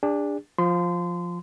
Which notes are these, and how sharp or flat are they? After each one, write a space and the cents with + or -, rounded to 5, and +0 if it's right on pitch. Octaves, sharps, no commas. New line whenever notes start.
D4 +0 G#4 -40
F3 +5 C6 -30